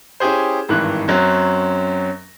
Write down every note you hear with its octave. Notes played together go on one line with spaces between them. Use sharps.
C#4 E4 G4 G#4 C5
G#1 G2 D#3 E3 F#6
F#2 F#3 C4 C#4